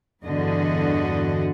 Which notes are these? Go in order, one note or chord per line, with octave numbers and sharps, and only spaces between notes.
E2 G2 D3 F#4 D#5